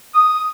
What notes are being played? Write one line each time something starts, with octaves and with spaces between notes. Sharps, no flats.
D#6